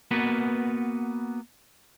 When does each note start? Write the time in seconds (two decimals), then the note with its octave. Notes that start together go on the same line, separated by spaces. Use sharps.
0.11 A#3 B3 F#4 B4